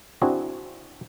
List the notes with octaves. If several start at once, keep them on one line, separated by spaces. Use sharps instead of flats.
C4 D4 E4 F#4 G#4